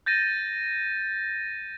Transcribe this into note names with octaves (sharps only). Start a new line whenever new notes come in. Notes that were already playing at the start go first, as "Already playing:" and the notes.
G6 A6 A#6 D#7